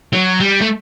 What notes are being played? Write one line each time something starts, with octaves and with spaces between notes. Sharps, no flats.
F#3
G3
A3